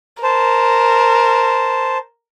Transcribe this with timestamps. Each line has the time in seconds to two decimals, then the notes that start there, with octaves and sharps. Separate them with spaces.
0.23 A#4 C5 A5